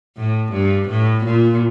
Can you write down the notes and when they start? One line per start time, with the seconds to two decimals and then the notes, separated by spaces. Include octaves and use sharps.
0.17 A2
0.52 G2
0.89 A2
1.25 A#2